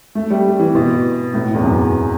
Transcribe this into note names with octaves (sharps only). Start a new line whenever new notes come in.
A3
G3
E3
B2
A2
E2
F#2